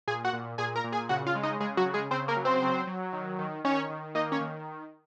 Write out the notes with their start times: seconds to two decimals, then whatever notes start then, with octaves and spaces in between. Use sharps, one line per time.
0.08 A#2 G#4 G#5
0.25 F#4 F#5
0.33 A#2
0.58 A#2 G#4 G#5
0.76 A#4 A#5
0.84 A#2
0.92 G#4 G#5
1.09 C#3 F#4 F#5
1.27 F4 F5
1.35 G#3
1.43 D#4 D#5
1.60 C#3 G#3 G#4
1.77 F#3 F#4
1.86 C#3
1.94 G#3 G#4
2.11 C#3 C4 C5
2.28 A#3 A#4
2.37 F#3
2.45 C4 C5
2.62 F#3
2.87 F#3
3.13 D#3
3.39 D#3
3.64 D#3 C#4 C#5
3.90 D#3
4.15 A#3 D#4 D#5
4.32 C#4 C#5
4.41 D#3